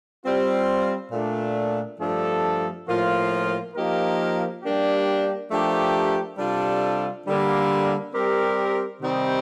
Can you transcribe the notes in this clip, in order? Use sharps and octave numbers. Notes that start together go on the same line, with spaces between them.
G3 C4 F4
A#2 A3 D4
G2 F3 A3 D4 A4
A2 F3 A#3 F4
F3 A#3 D#4 G4 A#4
G3 A#3 D4 G4
F3 A3 D4 G4 A#4
C3 G3 D4 F4 A4
D3 G3 A#3
G3 C4 G4 A#4
C3 D#3 G3 C4 D#4